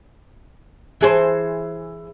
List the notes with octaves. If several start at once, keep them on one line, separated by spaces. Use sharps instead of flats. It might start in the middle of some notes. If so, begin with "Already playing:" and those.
E3 G#4 C5